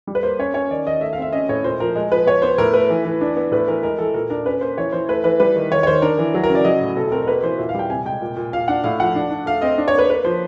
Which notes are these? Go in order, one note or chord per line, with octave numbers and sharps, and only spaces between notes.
G3
B4
A#3 C5
C#4 C#5
C#4 C#5
D#3 D5
D#3 D#5
A3 E5
F5
C4 E5
C#4 D#5
A2 C#5
A#2 C5
F3 A#4
G#3
F3 B4
B3 C#5
B3 C5
A2 A#4
A3 B4
E3
E3
D4
B3
A2 B4
E3 A#4
G#3 A#4
E3 A4
A#2 A#4
D4 A#4
C#4 B4
A#3 C5
E3 C#5
E3 C5
A3 B4
E3 B4
G3 B4
D#3
D#3 C#5
C#5
D#3 C5
D4 A#4
E3
F#3
A#4
C#3
D5
F#3 D#5
A2
B2 A4
A4
C4 A#4
A#4
A#3 B4
E3 C5
A#2 E5
F5
G3 G5
C3 G#5
G#3 G5
A#2
A#2
A#2 F5
D4 F#5
A2 F5
F3 F#5
D4
D4
A3 F5
C4 D#5
D4
C#5
A#3 B4
A#3 B4
F3 C5